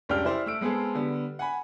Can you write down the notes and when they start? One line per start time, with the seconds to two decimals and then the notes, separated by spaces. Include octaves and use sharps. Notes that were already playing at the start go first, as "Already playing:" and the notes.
0.09 F1 C#2 G3 D4 G5 F6
0.25 E4 G4 C5 D5
0.46 A3 E6 D7
0.61 G#3 B3 C4 G#4 A4
0.95 D3 G3 B3
1.39 F#5 G#5 B5